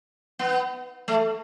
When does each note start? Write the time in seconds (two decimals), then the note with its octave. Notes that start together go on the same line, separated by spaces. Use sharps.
0.39 B3
1.08 A3